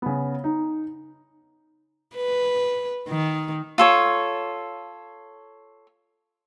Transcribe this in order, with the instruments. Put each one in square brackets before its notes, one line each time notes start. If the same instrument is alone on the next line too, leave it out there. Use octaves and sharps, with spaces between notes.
[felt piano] C#3 B3
D#4
[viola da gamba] B4
D#3
[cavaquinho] F4 A4 C#5